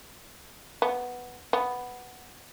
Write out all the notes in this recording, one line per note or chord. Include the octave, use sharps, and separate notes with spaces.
B3
B3